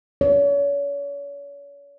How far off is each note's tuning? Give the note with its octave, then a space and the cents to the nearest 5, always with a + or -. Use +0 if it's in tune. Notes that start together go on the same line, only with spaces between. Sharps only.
C#5 +35